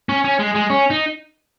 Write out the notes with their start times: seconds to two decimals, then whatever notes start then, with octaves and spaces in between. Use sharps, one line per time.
0.09 C#4
0.24 C#4
0.39 G#3
0.55 G#3
0.70 C#4
0.90 D#4